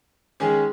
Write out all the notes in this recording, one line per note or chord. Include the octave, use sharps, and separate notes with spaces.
D#3 G#3 C#4 G#4